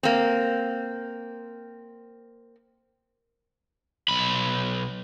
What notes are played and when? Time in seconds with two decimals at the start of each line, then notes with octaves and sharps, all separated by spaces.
0.03 A#3 C4
4.08 B1 B5